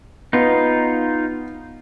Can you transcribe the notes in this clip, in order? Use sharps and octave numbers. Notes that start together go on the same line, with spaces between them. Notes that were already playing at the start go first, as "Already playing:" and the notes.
B3 D#4 F4